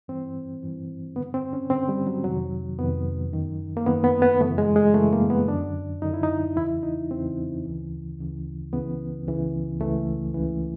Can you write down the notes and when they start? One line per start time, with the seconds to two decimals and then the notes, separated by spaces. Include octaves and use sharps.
0.08 G2 E3 C4
0.63 G2 E3
1.16 G2 D3 B3
1.34 C4
1.53 C#4
1.70 G2 D3 C4
1.89 G3
2.07 F#3
2.24 F2 C3 D#3 F#3
2.79 F2 C3 D#3 B3
3.33 F#2 D#3
3.77 A#3
3.86 F#2 D#3 B3
4.04 B3
4.22 B3
4.41 F#2 C#3 E3 A3
4.58 G#3
4.76 G#3
4.94 F#2 C#3 E3 A3
5.13 A#3
5.30 B3
5.48 F#2 D3 D4
6.02 F#2 D3 D#4
6.14 E4
6.23 D#4
6.56 E2 C#3 E3 E4
6.83 D#4
7.11 E2 C#3 E3 C4
7.65 D2 C#3 E3
8.18 D2 C#3 E3
8.73 C#2 C#3 E3 B3
9.27 C#2 C#3 E3
9.80 C#2 C#3 E3 A3
10.34 C#2 C#3 E3